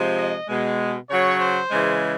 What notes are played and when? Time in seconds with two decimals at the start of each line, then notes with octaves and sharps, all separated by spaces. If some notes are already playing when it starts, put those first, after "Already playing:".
Already playing: C3 F3 G#3
0.17 D#5
0.49 B2 G#3
1.09 C#3 F#3 C#5
1.40 C5
1.71 C#3 E3 G#3